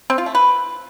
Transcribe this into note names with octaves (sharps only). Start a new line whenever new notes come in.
C4
F4
A3
B4